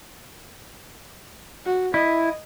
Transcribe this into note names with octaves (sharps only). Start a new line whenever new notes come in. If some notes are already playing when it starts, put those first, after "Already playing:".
F#4
E4 D#5